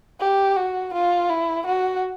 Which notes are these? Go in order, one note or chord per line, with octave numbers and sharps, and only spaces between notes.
G4
F#4
F4
E4
F#4